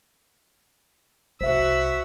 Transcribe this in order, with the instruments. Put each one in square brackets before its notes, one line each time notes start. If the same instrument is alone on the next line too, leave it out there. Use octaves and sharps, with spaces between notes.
[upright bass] C2 [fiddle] F#4 E6 [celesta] C5 E5 [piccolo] B6